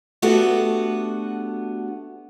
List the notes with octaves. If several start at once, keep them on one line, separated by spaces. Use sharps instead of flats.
A3 B3 D4 F#4 G4 A4